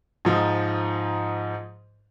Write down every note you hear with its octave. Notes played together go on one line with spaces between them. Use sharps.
G#2 F3 D#4